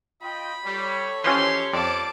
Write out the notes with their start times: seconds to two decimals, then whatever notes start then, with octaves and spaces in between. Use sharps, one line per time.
0.22 F4 D#5 G5 B5
0.65 G3 A4 C#5
1.24 E3 F3 G#3 C#4 F4 G4 C6
1.73 F2 A#3 C4 D5 A5 D6